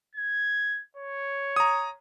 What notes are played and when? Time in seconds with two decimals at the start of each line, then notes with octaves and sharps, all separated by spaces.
0.15 G#6
0.97 C#5
1.56 A#5 D#6